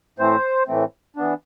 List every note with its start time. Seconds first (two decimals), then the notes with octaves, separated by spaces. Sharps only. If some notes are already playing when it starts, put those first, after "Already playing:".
0.19 A2 E3 A3 C4 C5
0.68 A2 E3 A3 C4
1.17 E3 B3 D4